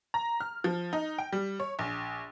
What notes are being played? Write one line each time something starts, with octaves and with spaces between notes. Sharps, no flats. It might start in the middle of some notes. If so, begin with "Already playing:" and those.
A#5
F6
F3
D#4
G5
G3
C#5
A#1